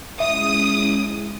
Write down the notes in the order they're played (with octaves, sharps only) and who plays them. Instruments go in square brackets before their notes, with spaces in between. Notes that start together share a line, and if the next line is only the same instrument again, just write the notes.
[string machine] G#3 C#4 E4 [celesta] E5 [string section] D#6